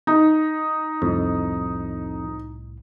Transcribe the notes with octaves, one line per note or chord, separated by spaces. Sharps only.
D#4
C2 F2 A2